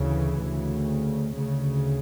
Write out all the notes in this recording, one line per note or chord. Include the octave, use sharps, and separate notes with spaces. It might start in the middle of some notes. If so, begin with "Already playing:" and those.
Already playing: D2 C#3 E3
D2 C#3
D2 C#3